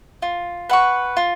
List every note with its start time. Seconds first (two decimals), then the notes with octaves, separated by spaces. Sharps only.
0.22 F4
0.69 B4 F#5 C#6
1.17 F4